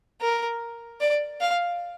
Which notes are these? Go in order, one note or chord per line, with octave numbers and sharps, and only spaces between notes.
A#4
D5
F5